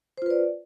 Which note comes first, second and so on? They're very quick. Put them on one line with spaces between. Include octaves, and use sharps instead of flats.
C5 F4 B4 D5